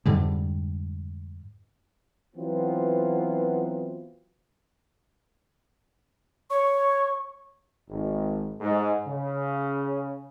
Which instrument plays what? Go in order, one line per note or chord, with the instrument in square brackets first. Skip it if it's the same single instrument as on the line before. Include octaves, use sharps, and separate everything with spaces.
[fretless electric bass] F2 G#2 D3 G3
[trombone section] E3 F#3 B3 C4 F4
[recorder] C#5 [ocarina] C#6
[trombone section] G#1
G#2
C#3